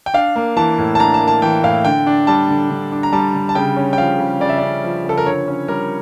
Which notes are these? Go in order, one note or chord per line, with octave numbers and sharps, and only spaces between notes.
G5
D4 F5
A#3
E3 A5
A2
A5
D4 A#5
A5
A#3
A5
E3 G5
A2 F5
D3 G5
D4
G3 A5
D3
D3
D4
A#5
G3 A5
D3
A5
C#3 G5
C#4
G5
F3 F5
C#3
C#3 D5
E5
C#4 D5
F3
C#3 A4
A#4
D3 C#5
C#4
G3 A#4